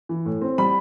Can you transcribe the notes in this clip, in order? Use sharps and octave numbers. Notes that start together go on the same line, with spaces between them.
E3
A2
C4
G3 B5